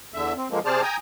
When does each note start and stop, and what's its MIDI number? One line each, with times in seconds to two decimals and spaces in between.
0.14 0.33 40
0.14 0.33 50
0.14 0.33 76
0.36 0.48 60
0.50 0.59 50
0.50 0.59 53
0.50 0.59 56
0.50 0.59 58
0.65 0.81 48
0.65 0.81 68
0.65 0.81 72
0.65 0.81 74
0.65 0.81 81
0.65 0.81 89
0.82 0.97 79
0.82 0.97 80
0.82 0.97 82
0.82 0.97 87